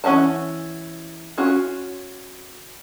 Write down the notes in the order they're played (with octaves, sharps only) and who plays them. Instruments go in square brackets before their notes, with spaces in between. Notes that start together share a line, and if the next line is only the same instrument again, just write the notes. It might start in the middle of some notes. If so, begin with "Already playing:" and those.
[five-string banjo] E3 C#4 E5 F#5 A5
C#4 F4 F#4